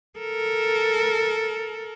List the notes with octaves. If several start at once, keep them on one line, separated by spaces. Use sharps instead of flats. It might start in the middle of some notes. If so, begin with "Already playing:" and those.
A4 A#4